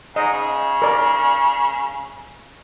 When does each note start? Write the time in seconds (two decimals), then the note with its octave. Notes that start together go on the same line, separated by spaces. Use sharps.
0.16 G#2 D#5
0.32 C#3
0.82 A#4 D5